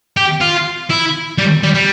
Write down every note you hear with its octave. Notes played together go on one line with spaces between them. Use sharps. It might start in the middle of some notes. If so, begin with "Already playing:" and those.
G4
F4
E4
G3
G3
G3